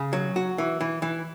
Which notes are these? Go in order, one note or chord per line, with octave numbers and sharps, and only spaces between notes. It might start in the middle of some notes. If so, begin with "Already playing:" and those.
Already playing: C#3
F#3
F#4
E3
E3
E3